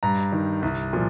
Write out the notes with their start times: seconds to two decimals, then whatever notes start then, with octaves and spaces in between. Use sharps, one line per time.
0.03 G2 A#5
0.32 D#3
0.62 C2
0.93 A#2 F3